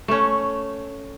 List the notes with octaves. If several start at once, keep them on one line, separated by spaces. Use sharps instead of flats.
A3 C#4